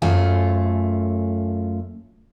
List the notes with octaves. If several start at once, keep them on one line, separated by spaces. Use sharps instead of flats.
F#2 A3 F4 G#5